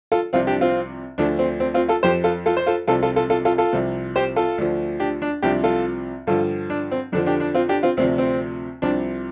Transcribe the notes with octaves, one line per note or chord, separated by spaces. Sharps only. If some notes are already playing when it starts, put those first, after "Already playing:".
F4 A4
C2 C3 F3 C4 F4
D4 G4
C4 F4
D2 D3 F3 D4
C4
C4
C4 F4
F4 A4
F2 F3 G4 C5
F4 A4
F4 A4
C5
F4 A4
C2 C3 F3 F4 A4
F4 A4
F4 A4
F4 A4
F4 A4
F4 A4
C2 C3 F3
G4 C5
F4 A4
D2 D3 F3
D4 G4
D4
C2 C3 F3 D4 G4
F4 A4
G2 D3 F3 F4 A4
D4
C4
F2 D3 F3 D4
D4 G4
D4
C4 F4
D4 G4
C4 F4
D2 C3 F3 C4
C4
C2 C3 F3 D4